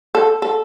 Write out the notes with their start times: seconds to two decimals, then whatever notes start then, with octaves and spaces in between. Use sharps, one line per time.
0.15 A4
0.42 A4